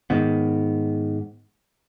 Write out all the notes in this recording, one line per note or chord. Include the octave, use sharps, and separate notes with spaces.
G#2 D#3 B3